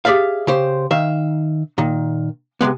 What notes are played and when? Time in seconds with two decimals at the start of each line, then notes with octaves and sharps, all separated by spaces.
0.05 G4 G#4 D5 E5 F5
0.47 C#3 G4 C5
0.91 D#3 E5 F5
1.78 A#2 D#3
2.61 C3 D#3 G#3 B3